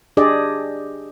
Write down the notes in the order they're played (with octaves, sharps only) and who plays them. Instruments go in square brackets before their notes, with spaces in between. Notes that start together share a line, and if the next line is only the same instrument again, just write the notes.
[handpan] D4 G4 G#4 D5 D#5